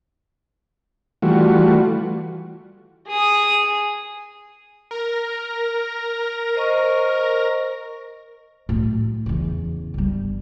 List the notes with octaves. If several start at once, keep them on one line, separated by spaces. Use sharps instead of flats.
E3 G3 A3 F4 F#4
G#4 D#6
A#4 A#6
C5 D#5 C#6
A2 F#3
E2 C#3
G1 G3